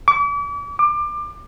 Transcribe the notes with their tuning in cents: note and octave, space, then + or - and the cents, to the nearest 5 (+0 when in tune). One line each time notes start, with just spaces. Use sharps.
D6 -40
D6 +25